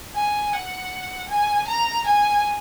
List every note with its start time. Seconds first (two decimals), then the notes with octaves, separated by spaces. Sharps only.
0.15 G#5
0.53 F#5
1.29 G#5
1.68 A#5
2.06 G#5